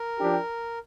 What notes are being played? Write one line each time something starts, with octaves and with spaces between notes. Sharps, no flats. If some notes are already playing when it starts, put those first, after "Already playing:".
Already playing: A#4
F3 D4 G4